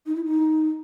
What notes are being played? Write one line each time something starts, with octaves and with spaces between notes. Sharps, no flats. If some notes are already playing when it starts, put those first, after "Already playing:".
D#4
E4
D#4